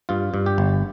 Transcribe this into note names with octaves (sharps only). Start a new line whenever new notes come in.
G2 F4
G2
G4
G1